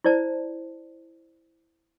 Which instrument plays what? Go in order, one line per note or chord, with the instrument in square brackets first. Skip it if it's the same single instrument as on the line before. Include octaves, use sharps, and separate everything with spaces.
[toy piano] E4 C5 D5 A5